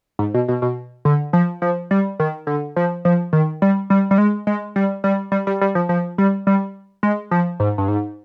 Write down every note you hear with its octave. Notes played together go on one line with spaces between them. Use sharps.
G#2
B2
B2
B2
D3
F3
F3
G3
D#3
D3
F3
F3
D#3
G3
G3
G3
G#3
G#3
G3
G3
G3
G3
G3
F3
F3
G3
G3
G#3
F3
G#2
G2
G#2